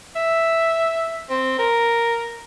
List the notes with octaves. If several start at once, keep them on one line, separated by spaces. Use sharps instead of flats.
E5
C4
A#4